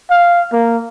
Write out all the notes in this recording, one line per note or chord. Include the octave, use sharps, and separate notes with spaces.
F5
A#3